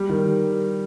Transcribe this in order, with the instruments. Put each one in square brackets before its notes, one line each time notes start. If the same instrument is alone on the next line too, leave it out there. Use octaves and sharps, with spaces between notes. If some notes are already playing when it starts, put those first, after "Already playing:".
Already playing: [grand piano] G3
D#3